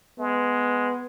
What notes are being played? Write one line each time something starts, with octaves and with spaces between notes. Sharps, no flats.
G#3 B3